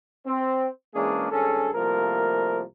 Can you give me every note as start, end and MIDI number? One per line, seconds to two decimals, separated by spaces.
0.26 0.67 60
0.94 1.27 52
0.94 1.27 56
0.94 1.27 58
0.94 1.27 61
0.94 1.27 62
0.94 1.27 68
1.31 1.69 32
1.31 1.69 43
1.31 1.69 61
1.31 1.69 68
1.31 1.69 69
1.74 2.61 36
1.74 2.61 53
1.74 2.61 57
1.74 2.61 58
1.74 2.61 70